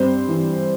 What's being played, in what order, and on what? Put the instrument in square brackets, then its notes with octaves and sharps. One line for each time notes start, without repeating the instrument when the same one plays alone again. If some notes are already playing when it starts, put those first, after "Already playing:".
Already playing: [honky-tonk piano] G2 C4 C5
E3